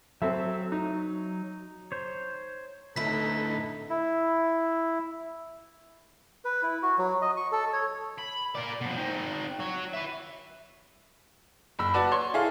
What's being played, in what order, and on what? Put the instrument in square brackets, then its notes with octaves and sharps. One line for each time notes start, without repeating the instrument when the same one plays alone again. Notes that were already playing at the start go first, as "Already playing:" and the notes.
[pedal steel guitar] F#3 [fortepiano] C4 A4 E5
[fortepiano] D#4
[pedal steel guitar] C5 C#5
[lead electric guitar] D2 A2 [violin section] D#4 A4 [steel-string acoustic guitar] E4 B4 [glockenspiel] B6
[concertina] E4
[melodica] B4
E4
F#4
F#3
D#5
C#6
A4
C#5
[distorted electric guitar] B5
A#4 D5
B2 F3
C4 D#4
F#4 C#5
B4 E5
[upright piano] F#1 B5 E6
F#4 B4 D5 A5
C#5 C6
E4 G#4 A4 F5